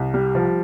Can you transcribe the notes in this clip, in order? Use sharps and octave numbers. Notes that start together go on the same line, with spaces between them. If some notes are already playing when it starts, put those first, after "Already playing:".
Already playing: C2
G3
F3